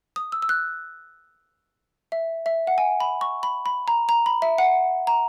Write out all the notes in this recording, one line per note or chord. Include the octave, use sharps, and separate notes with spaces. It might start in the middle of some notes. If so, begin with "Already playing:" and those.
D#6
E6
E6
F#6
E5
E5
F#5
G#5
B5
C#6
B5
B5
A#5
A#5
B5
E5
F#5
A#5